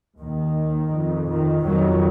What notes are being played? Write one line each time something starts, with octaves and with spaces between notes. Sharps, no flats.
D#2 D#3
F2
D#3
F2 D#3 F#3